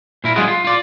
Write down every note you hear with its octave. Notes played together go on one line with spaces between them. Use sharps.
A#2 E4 A#4
D3 F#3 G#3 F4 G#4 F#5
F4
F4 D5